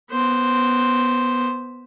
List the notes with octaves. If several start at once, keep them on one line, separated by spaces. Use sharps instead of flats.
B3 C5